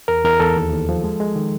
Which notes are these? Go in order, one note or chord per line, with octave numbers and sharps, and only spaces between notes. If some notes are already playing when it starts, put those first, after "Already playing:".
E2 A#4
E2 A#4
E2 A4
D#2
D#2
F3
G#3
G#3
D#3